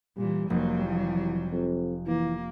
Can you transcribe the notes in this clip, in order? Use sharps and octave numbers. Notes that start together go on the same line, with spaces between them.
A#2 E3 G3
F1 F#3 G3 A#3
E3
F2
E3 A#3